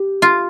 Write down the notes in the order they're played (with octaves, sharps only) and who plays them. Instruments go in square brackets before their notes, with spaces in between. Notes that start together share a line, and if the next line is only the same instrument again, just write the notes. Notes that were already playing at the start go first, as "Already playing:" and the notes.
Already playing: [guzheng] G4
F4